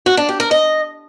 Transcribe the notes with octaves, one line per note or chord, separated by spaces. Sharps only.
F#4
D4
G4
A#4
D#5